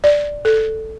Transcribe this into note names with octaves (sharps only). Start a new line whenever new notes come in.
D5
A4